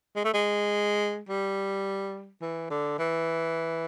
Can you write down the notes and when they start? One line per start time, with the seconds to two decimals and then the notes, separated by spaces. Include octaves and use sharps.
0.16 G#3
0.24 A3
0.34 G#3
1.29 G3
2.41 E3
2.70 D3
2.99 E3